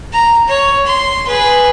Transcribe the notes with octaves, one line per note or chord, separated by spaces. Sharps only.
A#5
C#5
C6
G#4 B4